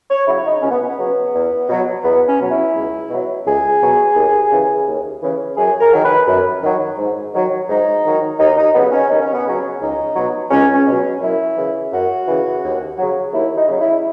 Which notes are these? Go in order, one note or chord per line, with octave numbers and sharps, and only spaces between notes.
C#5
C#3 F#3 E4
D#4
C#2 C#4
B3
B3
C#3 F#3
E2
B2 F#3
E2 B3
C#4
B2 F#3
E4
C#2
B2 F#3
C#2 G#4
B2 F#3
D#2
C#3 E3
D#2
C#3 E3
F#2 G#4
A#4
D#3 F#3
B4
F#2
D#3 F#3
G#2
D#3 F#3
G#2 D#4
D#3 F#3
D#2 D#4
D#4
C#3 F#3 B3
C#4
D#2 D#4
C#4
B3
C#3 F#3 C#4
C#2 D#4
B2 F#3
C#2 C#4
C#4
B2 F#3
F#2 E4
C#3 E3
F#2 F#4
C#3 E3
D#2
C#3 F#3
D#2 E4
D#4
C#3 F#3
E4